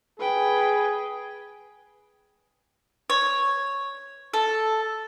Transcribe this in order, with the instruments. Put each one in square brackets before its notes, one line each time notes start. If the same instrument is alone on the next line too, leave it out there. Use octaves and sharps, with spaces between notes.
[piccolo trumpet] G#4 [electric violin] B4 G5
[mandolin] C#5
A4